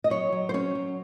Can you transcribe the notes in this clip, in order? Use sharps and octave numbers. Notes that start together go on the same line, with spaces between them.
D#5
F#3 C#5
F#3
C5
C#4 C#5
F#3